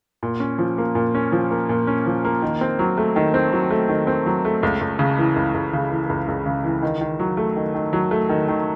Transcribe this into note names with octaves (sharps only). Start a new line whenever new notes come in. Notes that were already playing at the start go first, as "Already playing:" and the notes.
A#2
C#4
F3
A#3
A#2
C#4
F3
A#3
A#2
C#4
F3
A#3
D#3
C4
F#3
A3
D#3
C4
F#3
A3
D#3
C4
F#3
A3
C#2
C#2
C#3
E3
C#2
C#2
C#3
E3
C#2
C#2
C#3
E3
D#3
D#3
F#3
A3
D#3
D#3
F#3
A3
D#3
D#3